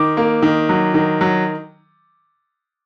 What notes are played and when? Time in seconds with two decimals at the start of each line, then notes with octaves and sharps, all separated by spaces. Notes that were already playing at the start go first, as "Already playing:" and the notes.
Already playing: D#3 D6
0.17 A#3
0.42 D#3
0.69 F#3
0.94 D#3
1.21 F#3